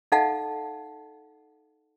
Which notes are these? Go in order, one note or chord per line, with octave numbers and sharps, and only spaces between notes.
D#4 A4 D#5 F5 F#5 A5